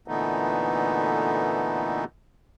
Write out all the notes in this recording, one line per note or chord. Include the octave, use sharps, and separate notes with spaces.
A#2 D3 E3 A3 B3 D#4